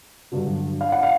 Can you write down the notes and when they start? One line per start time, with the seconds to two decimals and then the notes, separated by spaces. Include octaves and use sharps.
0.32 G2 D3 F#3
0.81 F5
0.92 F#5
1.03 F5